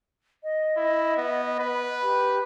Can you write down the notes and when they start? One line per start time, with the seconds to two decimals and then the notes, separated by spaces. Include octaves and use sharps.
0.43 D#5
0.77 E4
1.17 B3
1.59 B4
2.02 G4